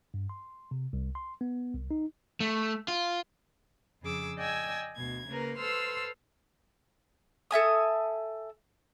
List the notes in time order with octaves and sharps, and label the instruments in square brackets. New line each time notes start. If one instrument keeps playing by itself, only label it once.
[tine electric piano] G2
C6
C3
C2
C6
B3
C2
D#4
[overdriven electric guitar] A3
F4
[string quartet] F2 C#3 G#4 D6 E6
D5 D#5 G5 G#5 E6 G#6
D2 B2 G#6
C#3 A#3 A#4 B4
A4 B4 C5 C6 E6 F6
[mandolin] A4 E5 G#5 D#6